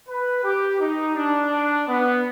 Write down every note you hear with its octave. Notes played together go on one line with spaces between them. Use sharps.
B4
G4
D#4
D4
B3